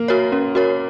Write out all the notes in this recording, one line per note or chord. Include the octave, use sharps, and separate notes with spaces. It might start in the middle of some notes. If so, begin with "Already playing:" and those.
Already playing: A#3
F#4 A#4 C#5
C#4
F#4 A#4 C#5